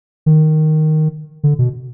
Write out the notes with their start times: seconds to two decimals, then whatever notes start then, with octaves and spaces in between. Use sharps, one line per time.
0.26 D#3
1.43 D3
1.59 B2